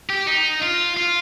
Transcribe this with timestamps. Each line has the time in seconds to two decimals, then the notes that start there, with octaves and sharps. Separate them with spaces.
0.10 G4
0.27 D#4
0.62 F4
0.97 F4